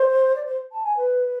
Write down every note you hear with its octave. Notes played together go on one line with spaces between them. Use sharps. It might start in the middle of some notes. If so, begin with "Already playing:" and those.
Already playing: C5
D5
C5
A5
G#5
B4